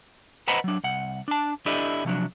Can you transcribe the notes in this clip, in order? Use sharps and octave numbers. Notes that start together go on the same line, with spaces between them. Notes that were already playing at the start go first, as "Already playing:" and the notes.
B4 C5 D#5 F#5 A#5 B5
F#3 D4
C2 F#5
D4 A5
D4 E4 G4 A4 D5 D#5
C3 F3 F#3 D4